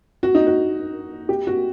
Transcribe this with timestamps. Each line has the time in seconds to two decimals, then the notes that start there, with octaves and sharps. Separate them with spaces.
0.23 F#4
0.35 D#4
0.47 F#4
1.29 G4
1.47 F#4